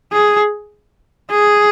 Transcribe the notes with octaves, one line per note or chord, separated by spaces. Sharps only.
G#4
G#4